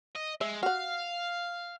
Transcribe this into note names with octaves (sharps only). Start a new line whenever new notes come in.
D#5
G#3 E5
F#4 F5 F#5